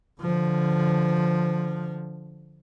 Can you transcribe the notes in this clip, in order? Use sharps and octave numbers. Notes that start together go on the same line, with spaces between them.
D3 F3